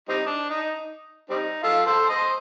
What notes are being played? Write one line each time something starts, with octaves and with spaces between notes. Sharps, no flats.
G3 C4 D#4
D4
D#4
G3 C4 D#4
F4 A4
A4 C5
C5 D#5